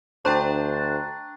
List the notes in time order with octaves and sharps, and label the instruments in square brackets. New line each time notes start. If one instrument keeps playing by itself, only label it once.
[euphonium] D2 [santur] D4 [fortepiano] C5 [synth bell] G5 A#5 C#6